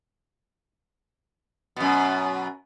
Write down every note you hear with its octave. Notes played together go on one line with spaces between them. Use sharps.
F#2 B2